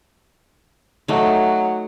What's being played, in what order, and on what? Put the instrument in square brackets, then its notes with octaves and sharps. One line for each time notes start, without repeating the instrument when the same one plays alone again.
[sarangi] F#3 [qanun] A3 D#4